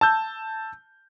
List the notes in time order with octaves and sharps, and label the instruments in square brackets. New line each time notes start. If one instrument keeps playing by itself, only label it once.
[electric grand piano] A5 E6 G6